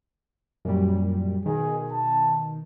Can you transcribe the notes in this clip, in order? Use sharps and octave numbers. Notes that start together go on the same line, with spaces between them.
F#2 A#2 G3
B2 D#3 G#4
A5